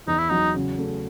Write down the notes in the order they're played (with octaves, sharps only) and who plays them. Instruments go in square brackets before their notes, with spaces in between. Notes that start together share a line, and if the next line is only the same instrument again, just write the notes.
[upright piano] E2 [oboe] D#4
[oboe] E4
[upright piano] F#3 [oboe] D#4
[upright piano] C#3
A3